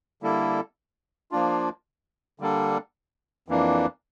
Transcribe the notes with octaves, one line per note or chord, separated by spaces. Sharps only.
D3 G3 A#3 E4 A4
F3 A#3 D4 F4
D3 G3 A#3 D4 A4
F2 E3 A#3 D4